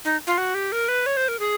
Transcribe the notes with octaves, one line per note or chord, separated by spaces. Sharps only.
D#4
F4
F#4
G4
A#4
B4
C#5
C5
A#4
G#4